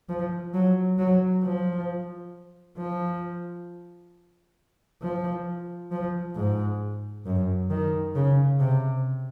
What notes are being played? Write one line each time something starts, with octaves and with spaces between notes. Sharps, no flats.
F3
F#3
F#3
F3
F3
F3
F3
G#2
F#2
D#3
C#3
C3